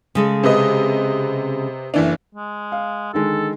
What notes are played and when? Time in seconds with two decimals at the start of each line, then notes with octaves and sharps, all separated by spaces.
0.15 C#3 G#3 A4
0.43 C3 B4 D#5
1.94 F#1 E3 D4
2.35 G#3
2.72 F5
3.14 D3 D#3 G#3 A4